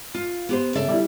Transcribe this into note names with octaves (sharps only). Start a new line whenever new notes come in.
F4
B3 G4 C5
C#3 A4 D5 E5
G3 D4 E4